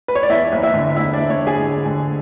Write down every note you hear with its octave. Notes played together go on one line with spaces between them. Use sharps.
B4
C#5
D5
E2 E4 E5
F#1
E4 E5
D3
E2 E4 E5
D4 D5
F#1
C#5
F#1
G#4 G#5
D3
D3